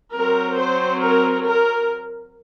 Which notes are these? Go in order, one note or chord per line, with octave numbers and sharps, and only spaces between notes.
F#3 C4 A#4
C5
A#4
A#4